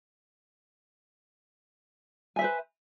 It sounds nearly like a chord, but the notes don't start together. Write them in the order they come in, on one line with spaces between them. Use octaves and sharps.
G#5 E5 C5 B4